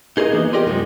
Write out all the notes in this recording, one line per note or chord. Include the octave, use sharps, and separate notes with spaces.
D#4 G#4 A#4 C5 D#5
E3 A#3 B3
F4 G4 A#4 D5 D#5 G5
F#2 C3 F3 G#3 C4 D#4